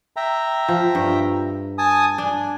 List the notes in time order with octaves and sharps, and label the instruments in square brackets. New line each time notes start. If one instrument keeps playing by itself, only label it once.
[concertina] E5 G5 A#5
[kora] F3
G2
[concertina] G#5 A5 D#6
[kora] D4 [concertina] G#5